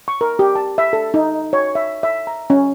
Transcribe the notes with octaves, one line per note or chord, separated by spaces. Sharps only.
C#6
A#4
G4
A5
E5
A4
D#4
C#5
E5
E5
A#5
C#4